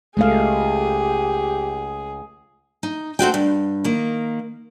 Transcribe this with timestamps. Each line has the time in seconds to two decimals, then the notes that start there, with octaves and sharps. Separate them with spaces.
0.17 C#2 G#3 A3 G4 G#4 F5
2.83 D#4
3.19 A3 C4 F#4 G5
3.34 G2
3.84 D#3 A#3